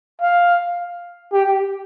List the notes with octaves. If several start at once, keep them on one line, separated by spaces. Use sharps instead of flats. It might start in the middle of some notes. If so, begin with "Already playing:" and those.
F5
G4